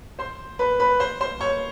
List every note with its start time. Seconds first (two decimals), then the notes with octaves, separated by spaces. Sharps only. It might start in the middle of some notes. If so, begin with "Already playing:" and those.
0.19 C5 C6
0.59 B4 B5
0.80 B4 B5
1.00 C5 C6
1.21 C5 C6
1.41 C#5 C#6